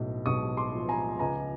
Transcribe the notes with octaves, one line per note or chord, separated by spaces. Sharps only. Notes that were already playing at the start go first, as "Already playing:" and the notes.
Already playing: B1 A2
B1 C#6 D#6
C6 D6
F3
G#5 A#5
C#2 G#5 A#5